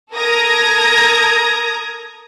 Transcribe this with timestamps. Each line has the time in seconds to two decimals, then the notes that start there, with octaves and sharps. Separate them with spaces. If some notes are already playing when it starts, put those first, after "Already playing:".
0.11 A4 A#4 A#5 D#6 G#6 A#6